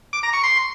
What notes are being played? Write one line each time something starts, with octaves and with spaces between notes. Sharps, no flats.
D6
A#5
C#6
C6